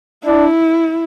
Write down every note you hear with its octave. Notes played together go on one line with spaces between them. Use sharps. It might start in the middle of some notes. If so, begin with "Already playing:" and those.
D4 E4